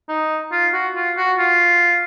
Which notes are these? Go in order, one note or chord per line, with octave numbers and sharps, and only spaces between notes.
D#4
F4
F#4
F4
F#4
F4